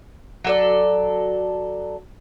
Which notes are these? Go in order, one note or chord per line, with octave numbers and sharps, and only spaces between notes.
F#3 A4 D5